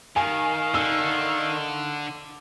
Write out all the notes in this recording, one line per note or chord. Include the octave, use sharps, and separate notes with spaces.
D#3 F5 G#5
D3 E6